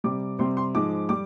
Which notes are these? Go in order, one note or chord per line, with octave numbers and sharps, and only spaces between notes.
C3 G3 D6
C3 G3 C6
C6
G#2 F3 G#3 D6
G3 D6